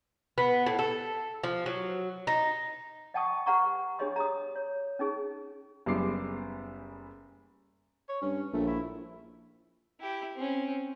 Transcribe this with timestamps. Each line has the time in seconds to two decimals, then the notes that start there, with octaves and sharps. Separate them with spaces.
0.38 B3
0.67 A2
0.79 A4
1.44 F3
1.66 F#3
2.27 D#4
3.14 D#5 F#5 G5 A5 C#6 D#6
3.46 G4 B4 F#5 A#5 C#6
3.99 D4 G4 G#4 C#5 D#5 C6
4.16 A#5 D#6
4.56 C#5
4.99 C#4 D#4 G#4
5.86 F#1 G3 B3 G#4 D6 C7
8.09 C#5
8.22 G2 C#4
8.53 A#1 A3
8.68 E4
10.00 E4 G4
10.36 C4 C#4